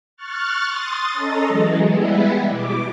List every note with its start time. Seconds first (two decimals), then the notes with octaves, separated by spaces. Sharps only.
0.17 C#6 F6 F#6 A6
0.67 C6 D#6 A6
1.13 C#4 A4 D#5 A#5
1.46 E3 F#3 G#3
1.84 G3 G#3 B3 E4
2.47 B2 D6